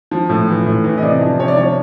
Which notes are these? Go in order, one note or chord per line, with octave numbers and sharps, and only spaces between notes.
F3
A2
E3
A2
E3
D#5
C3 D5
F3
C3 C#5
D5
F3 C#5